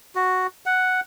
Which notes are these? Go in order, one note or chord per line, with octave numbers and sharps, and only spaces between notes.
F#4
F#5